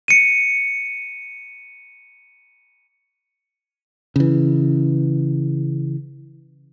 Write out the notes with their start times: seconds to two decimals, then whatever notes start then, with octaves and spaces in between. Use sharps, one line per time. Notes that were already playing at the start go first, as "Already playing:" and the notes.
0.08 C#7 D#7
4.16 C#3 E3